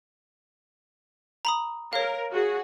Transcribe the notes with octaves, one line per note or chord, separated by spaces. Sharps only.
A#5 B5 D#6
A#4 C#5 F5
F#4 G#4